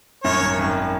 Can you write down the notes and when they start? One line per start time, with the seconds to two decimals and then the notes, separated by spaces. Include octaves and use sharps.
0.24 F#2 C#5
0.41 G#1
0.59 G#1